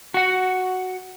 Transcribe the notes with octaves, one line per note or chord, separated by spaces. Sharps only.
F#4 F#5